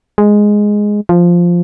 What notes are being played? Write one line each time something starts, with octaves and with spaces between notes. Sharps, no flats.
G#3
F3